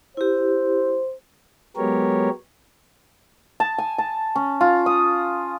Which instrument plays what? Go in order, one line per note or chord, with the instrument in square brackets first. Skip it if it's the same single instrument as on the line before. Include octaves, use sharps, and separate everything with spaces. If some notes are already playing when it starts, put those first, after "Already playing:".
[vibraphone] E4 G4 [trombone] C5
[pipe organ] F#3 G#3 B3 G4 A#4 C#5
[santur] A5
G#5
A5
C#4
F4
D#6